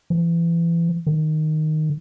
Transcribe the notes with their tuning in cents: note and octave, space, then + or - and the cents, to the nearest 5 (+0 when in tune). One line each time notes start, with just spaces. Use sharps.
E3 +30
D#3 -5